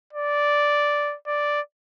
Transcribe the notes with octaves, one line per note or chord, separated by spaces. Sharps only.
D5
D5